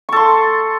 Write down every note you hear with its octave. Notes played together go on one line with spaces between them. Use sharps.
A4 C6 C#6